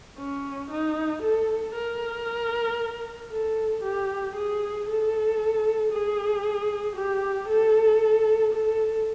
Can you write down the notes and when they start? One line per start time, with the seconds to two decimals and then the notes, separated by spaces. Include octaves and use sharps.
0.19 C#4
0.71 D#4
1.23 A4
1.75 A#4
3.31 A4
3.83 G4
4.36 G#4
4.88 A4
5.92 G#4
6.96 G4
7.49 A4
8.53 A4